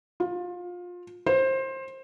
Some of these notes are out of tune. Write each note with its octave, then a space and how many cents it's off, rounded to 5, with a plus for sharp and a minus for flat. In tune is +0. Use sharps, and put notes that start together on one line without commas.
F4 +25
C5 +20